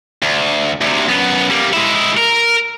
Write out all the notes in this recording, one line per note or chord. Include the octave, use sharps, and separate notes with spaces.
D2
D2 C3
F#2 B3
G3 A#3
G#3 E4
A#4